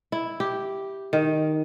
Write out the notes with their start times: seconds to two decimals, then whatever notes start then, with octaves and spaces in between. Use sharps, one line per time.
0.12 E4
0.40 G4
1.13 D#3